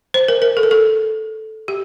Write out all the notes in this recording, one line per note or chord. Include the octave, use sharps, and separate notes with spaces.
C5
A#4
A#4
A4
A#4
A4
G4